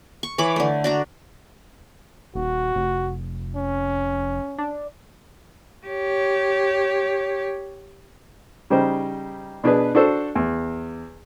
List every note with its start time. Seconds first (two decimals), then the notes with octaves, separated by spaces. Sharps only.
0.23 C#6
0.38 E3 C#5 B5 D6
0.56 D3 A3
0.84 D4 F#4 A#5
2.35 D#1 F#4
2.76 F1
3.55 C#4
4.58 D4
5.87 G4 C#5
8.70 C#3 G3 D#4 C5
9.64 B2 D4 G#4 B4
9.95 D4 F#4 A4 C5
10.35 E2